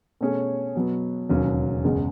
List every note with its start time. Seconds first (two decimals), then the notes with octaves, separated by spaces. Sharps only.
0.21 B2 A3 C#4 G#4 C#5
0.76 B2 F#3 B3
1.29 E1 D#2 C#3 F#3 C#4
1.84 F#1 E2 C#3 G#3